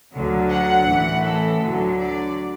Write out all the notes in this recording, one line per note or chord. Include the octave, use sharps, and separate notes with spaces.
D2 D3 F#3
F#5
A1 A2 E3
A4
D2 D3 F#3
D5